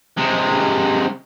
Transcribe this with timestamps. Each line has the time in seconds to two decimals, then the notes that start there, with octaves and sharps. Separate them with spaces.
0.17 C3 G#3